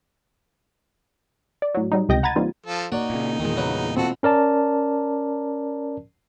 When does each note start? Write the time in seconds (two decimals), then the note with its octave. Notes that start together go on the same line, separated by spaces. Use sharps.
1.62 D5
1.75 A2 F#3
1.92 F#3 G3 D#4
2.09 C#2 C3 D#5 G5 G6 A#6
2.23 F#5 A#5 B5 G#6 A6 D#7
2.36 E3 G3 A#3 C4 D#4 F4
2.66 F3 F4 A4
2.92 A#3 D#4 F#4 C#5 D5
3.10 A#2 C#3
3.40 E2 A#2 D#3 G#3
3.57 C#3 F#3 B4
3.97 B2 C4 F4 F#4 A4
4.23 C#4 A#4 D5 A5